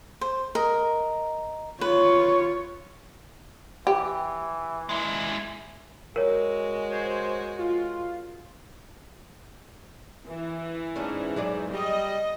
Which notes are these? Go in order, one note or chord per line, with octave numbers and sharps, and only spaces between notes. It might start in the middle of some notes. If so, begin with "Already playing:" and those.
C5
A#4 D#5
F4 B4 C#5
E3 G4
G#3 E4
G#3 F#4 A#4 C#5
C5 G#6
F4
E3
G#2 C#4 D4 G#4
F#3 G#4 D5
G3 D#5